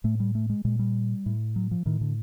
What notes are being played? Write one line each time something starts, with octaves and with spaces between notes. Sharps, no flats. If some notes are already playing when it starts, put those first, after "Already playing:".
A2 A3
G3
A3
G#3
A#2 G#3
G3
A2
F#3
F3
A2 D#3
D3